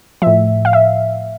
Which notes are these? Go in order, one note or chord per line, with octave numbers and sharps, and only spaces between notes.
A2 F3 E5
F5
E5